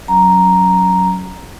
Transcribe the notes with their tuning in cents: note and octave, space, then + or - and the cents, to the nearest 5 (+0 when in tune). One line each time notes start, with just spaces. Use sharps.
F#3 +0 C#4 +0 A#5 +0